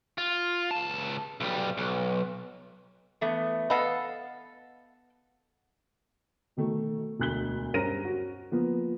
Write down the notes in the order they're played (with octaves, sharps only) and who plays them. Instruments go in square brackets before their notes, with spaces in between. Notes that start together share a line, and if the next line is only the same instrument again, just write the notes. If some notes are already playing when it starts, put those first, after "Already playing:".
[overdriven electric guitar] F4
C#2 A5
B1 G3
B1
[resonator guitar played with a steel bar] E3 A3 B3
[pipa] B3 A4 [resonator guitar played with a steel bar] D#5 F5 F#5
[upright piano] B2 D#3 A3
E1 D2 F#6 B6 G7
G2 C#4 A#4 C5 A#6 D#7
F#4
F3 A#3 B3